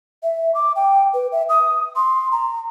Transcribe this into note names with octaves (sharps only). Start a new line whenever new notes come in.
E5
D6
G5
B4
E5
D#6
C6
A#5